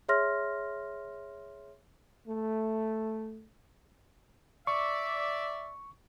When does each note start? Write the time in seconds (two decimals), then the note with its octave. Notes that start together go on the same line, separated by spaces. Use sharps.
0.09 G#4 C#5 E5 C6 F6 A#6
2.28 A3
4.67 D5 E5 C#6